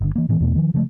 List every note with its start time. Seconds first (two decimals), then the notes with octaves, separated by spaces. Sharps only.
0.01 G1 D3
0.16 E3 A#3
0.29 A2 D#3 E3 B3
0.40 E2 B2 A3 B3
0.56 D#3 F3
0.74 C#3 F3 G#3 A3